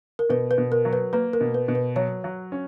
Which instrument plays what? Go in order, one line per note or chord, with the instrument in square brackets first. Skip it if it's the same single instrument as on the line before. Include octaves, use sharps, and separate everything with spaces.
[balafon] A#4
[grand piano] B2 [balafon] B4
[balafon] B4
[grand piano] B2
[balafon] A#4
[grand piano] F#3
[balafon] B4
[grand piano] A#3 [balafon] B4
[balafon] A#4
[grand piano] B2
[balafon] B4
[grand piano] B2
[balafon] B4
[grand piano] F#3 [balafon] C#5
[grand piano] F#3
C#4